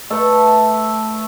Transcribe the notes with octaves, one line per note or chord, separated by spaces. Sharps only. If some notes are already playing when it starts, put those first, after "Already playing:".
A3 A4 B4 E5